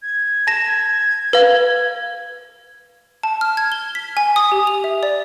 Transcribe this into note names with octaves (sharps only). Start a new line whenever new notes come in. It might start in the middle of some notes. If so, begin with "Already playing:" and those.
G#6
A5 A#6 E7
B4 F5
A5
F6
G#6
G7
B6
G#5
D#6
G4
F7
E5
D5